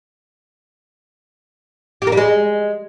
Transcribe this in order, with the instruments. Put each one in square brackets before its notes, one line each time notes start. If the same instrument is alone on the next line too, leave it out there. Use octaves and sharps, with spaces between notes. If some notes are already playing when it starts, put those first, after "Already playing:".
[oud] G4
A#3
G3
G#3